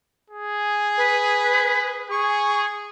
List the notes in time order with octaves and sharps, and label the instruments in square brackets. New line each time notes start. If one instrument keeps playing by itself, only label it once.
[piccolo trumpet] G#4
[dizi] B4
[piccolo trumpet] G#4 [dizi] C#6